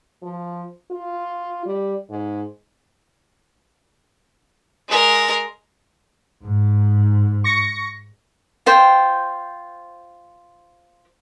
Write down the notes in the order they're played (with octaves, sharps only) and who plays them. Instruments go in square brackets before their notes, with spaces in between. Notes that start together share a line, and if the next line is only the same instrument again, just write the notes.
[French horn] F3
F4
G3
G#2
[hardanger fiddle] G#3 A#4
[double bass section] G#2
[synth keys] C#6 A#6 C#7
[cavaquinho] F4 C5 G5